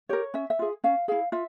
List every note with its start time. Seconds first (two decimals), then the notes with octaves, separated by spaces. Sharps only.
0.09 G4 A#4 C#5
0.34 C#4 E5
0.50 E5
0.59 F4 G#4
0.84 C#4 F5
1.08 E4 G#4 F5
1.32 F4 E5